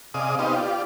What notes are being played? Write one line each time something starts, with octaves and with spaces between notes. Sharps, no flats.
C3 G#4 D5 D#5 F5 D#6
B3 D#4 G4 C5 D#5 F5
F4 G4 D5